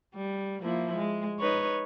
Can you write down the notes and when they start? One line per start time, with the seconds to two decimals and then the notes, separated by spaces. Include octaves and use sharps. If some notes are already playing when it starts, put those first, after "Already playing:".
0.15 G3
0.62 F3 A#3 E4
0.96 G#3
1.40 D#4 B4 C#5